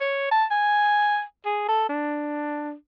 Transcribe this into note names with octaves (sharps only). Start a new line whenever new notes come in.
C#5
A5
G#5
G#4
A4
D4